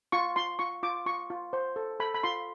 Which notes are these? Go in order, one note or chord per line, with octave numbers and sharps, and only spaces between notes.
F4 C#6
F4 C6
F4 C#6
F4 D6
F4 C#6
F4
C5
A4
A4 B5
B5
F4 C6